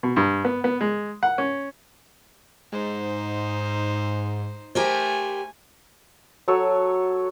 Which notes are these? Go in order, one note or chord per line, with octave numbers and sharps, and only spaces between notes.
B2
G2
B3
B3
G#3
F#5
C#4
G#2 D#4 C5
A3 G4 A#4 C5 G#5
F#3 A4 C#5 E6